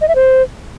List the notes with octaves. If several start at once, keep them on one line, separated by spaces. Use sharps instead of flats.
D#5
E5
C5